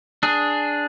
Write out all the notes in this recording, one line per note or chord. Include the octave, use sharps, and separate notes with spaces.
D4 G#4